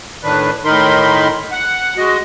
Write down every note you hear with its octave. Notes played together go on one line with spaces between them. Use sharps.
A2 D#3 D4 B4
A2 D#3 D#4 A#4 B5 C6
F#5
G#3 F#4 D#5